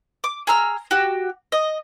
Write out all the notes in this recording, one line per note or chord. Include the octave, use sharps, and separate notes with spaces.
D6
G#4 A#5 E6 F6
F#4 G4
D#5